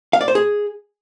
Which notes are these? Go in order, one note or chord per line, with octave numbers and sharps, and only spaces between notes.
F5
D5
C5
G#4